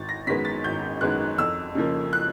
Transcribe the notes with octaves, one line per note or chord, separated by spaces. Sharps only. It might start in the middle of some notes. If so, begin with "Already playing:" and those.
Already playing: G#1 A6
A#6
F#2 D#3 G#3 B3 B6
A6
G#1 G6
F#2 D#3 G#3 B3 F#6
F2 E6
C#3 F3 A#3
F#6